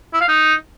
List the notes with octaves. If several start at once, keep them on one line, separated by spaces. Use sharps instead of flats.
E4
F5
D#4